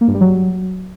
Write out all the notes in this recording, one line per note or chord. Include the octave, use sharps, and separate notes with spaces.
A#3
G2
G3
F#3